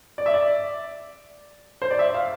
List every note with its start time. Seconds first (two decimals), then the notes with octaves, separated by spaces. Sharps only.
0.18 D5
0.26 E5
0.34 D5
1.82 C5
1.91 D5
1.99 E5
2.14 F5